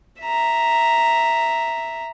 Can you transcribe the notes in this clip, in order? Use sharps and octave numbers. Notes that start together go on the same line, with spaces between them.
E5 A#5